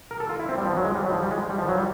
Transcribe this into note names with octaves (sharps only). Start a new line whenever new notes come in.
A#4
A4
F4
E4
C4
G3
F3
F#3
G#3
G3
F#3
F3
G3
G#3
G3
F3
F#3
G3